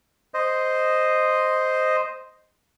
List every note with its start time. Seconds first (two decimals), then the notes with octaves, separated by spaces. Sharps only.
0.34 C5 D#5